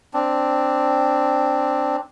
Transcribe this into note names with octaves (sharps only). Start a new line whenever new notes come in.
C4 D4